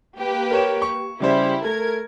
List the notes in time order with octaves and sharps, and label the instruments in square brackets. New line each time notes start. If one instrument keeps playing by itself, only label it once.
[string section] A#3 G4 B4
[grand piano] A#4 C#5 E7
C#6
[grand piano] C#3 G3 C5 [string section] E4 G4
[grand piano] A3 [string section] A#4 G#6